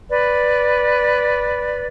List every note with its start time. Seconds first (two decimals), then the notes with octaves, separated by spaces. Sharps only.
0.10 B4 D5